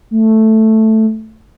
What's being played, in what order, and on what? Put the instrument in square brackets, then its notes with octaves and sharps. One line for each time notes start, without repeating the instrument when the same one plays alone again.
[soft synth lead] A3